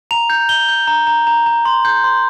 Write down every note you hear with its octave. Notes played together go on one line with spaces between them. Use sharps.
A#5 F7
G6
G6 G7
G6
A#5
A#5
A#5
A#5
C6
G6
C6